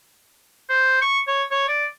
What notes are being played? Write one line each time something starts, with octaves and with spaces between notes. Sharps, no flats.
C5
C#6
C#5
C#5
D5